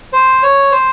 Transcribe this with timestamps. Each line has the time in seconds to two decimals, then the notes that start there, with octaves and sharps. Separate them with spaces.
0.13 C5
0.43 C#5
0.72 C5